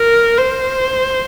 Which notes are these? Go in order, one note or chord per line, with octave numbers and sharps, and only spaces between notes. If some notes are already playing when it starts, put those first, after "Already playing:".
Already playing: A#4
C5